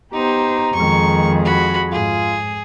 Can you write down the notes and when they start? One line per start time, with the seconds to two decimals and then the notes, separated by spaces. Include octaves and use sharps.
0.13 B3 D#4 G4 C5 A#5
0.74 F2 D#3 G#3 G#4 C#6
1.45 F#4 B5
1.92 G#2 F4 G#4